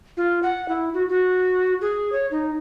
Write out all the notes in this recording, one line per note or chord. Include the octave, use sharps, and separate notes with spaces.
F4
F#5
E4
F#4
F#4
G#4
C#5
D#4